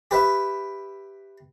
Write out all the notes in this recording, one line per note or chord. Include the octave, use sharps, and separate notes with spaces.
G4 B4 E5